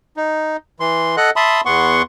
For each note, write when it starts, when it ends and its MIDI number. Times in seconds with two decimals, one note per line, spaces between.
0.17 0.57 63
0.80 1.16 52
0.80 1.16 84
1.17 1.30 69
1.17 1.30 75
1.17 1.30 78
1.17 1.30 90
1.36 1.61 76
1.36 1.61 81
1.36 1.61 83
1.36 1.61 84
1.36 1.61 87
1.65 2.02 40
1.65 2.02 59
1.65 2.02 78
1.65 2.02 84
1.65 2.02 85